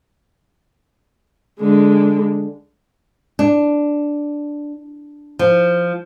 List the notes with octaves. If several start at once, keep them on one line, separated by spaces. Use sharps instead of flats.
D3 G#3
D4
F3